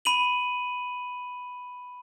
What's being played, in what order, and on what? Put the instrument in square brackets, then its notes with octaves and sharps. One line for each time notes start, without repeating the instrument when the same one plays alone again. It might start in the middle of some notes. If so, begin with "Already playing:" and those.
[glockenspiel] B5 D#7 F#7